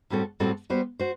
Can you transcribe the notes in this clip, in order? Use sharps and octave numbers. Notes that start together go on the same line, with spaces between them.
A2 G3 C4 F#4 A4
A2 G3 C4 F#4 A4
G3 B3 F#4 C5
F#4 C5